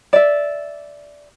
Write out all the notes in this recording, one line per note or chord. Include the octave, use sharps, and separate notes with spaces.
D5 E5